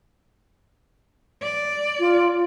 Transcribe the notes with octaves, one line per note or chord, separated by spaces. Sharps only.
D5
F4